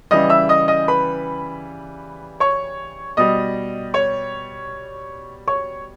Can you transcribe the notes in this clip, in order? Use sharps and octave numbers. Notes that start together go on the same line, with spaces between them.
C#3 E3 G3 D#5 D#6
E5 E6
D#5 D#6
D#5 D#6
B4 B5
C#5 C#6
B2 G3 D#5 D#6
C#5 C#6
C#5 C#6